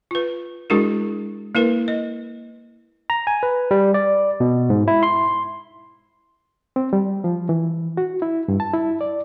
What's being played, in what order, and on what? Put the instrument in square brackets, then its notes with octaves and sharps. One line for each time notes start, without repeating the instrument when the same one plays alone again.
[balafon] F4 B4
G#3 D4 E4 F#4 G#4 A#4
A#3 E4 A#4 B4
D#5
[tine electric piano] A#5
G#5
B4
G3
D5
B2
G#2
E4
C6
[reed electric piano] C4
G3
F3
E3
F#4
E4
G2
A5
E4
D5